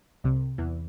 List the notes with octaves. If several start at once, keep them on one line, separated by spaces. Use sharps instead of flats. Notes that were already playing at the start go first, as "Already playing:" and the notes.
C2 C3
E2 E3